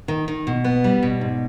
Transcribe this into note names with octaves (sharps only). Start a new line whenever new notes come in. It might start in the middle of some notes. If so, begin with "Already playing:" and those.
D#3
D#3
B2
B3
G3
B2
G#2